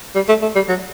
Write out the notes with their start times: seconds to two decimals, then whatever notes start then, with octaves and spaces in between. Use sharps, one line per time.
0.15 G3
0.29 A3
0.42 A3
0.55 G3
0.69 F#3